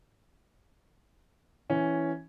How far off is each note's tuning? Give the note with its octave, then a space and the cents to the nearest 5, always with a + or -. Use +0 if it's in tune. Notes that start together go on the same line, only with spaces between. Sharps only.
E3 +0 C#4 +0